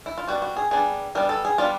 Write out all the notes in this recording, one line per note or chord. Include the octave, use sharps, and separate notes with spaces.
E4
F4
G3 B3 D4 F#4
F#4
G#4
G3 B3 D4 G#4
G3 B3 D4 A#4
A4
G#4
G3 B3 D4 F4